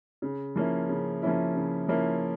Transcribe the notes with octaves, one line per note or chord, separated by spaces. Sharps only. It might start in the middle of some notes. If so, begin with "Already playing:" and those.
C#3
F3 A#3 C#4 E4
C#3
F3 A#3 C#4 E4
C#3
F3 A#3 C#4 E4